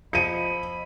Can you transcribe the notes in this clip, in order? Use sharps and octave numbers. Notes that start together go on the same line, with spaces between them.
F3 D#5 B5 C#7 D#7